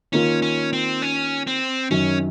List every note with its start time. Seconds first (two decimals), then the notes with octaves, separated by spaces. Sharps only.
0.13 D#3 A#3 C#4 F4
0.42 C#4
0.73 C4
1.02 C#4
1.47 C4
1.91 F#2 D#3 F#3 C#4